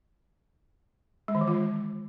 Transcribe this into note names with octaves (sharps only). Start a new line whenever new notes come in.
G#3
D#3
E3
F4
G#3